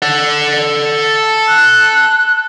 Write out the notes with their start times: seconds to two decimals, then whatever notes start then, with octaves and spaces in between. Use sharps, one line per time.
0.02 A4 F#5
1.48 F#6